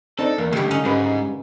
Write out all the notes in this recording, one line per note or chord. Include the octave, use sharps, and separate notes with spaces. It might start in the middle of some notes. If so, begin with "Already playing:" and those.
C4 D4 D#4 A4
E2 A#3
C#2 D3 G3 A3 G4
C#4 D#4 F#5
G#2 C#3 G3 B4